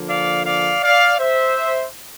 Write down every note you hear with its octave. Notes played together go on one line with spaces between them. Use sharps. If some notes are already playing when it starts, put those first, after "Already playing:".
Already playing: D3 F3 A#3
D5 F5
D5 F5
D5 F5
C5 E5